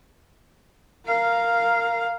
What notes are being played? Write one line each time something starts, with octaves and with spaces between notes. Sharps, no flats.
A#4 F5